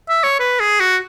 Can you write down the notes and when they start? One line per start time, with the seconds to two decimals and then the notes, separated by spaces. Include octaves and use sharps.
0.09 E5
0.24 C#5
0.40 B4
0.60 G#4
0.80 F#4